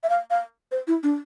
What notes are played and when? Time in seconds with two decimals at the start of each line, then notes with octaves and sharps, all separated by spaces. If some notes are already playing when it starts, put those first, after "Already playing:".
0.03 E5
0.10 F5
0.30 F5
0.72 C5
0.87 E4
1.03 D4